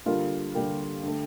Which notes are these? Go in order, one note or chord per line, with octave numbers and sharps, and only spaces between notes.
D3 G3 A#3 F4
D3 G3 A#3 G4
D3 A3